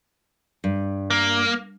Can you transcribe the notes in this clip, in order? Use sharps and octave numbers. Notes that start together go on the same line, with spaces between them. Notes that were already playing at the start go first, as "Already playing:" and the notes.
G2
A#3